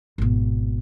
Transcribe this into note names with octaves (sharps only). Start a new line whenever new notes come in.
G#1 B2